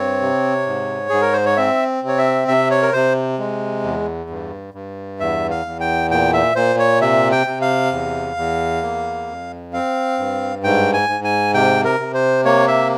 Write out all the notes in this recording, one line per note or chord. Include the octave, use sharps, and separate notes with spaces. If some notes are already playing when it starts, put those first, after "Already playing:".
Already playing: G2 C4 C#5
C3
G#2
G#2 G#4
A#4
C5
C#5
C4 E5
C3
C#5
E5
C3 E5
C#5
A#4
C3 C5
G#3
E2
G2
G2
E2 E5
F5
E2
G5
A#2 G5
E5
A#2 C5
C#5
C3 E5
G5
C3
F5
E2
E2
A#3
F2
C4 F5
G2
G#2 G5
G#5
G#2
G#5
C3 G5
A#4
C3
C5
A#3 C#5
E5